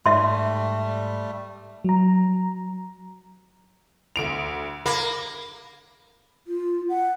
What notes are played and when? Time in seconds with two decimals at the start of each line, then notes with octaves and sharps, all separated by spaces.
0.06 G#2 G3 A3 E5 C6
1.84 F#3 A#5
4.16 D2 D7 F7
4.86 A#3 B5
6.47 F4
6.89 F#5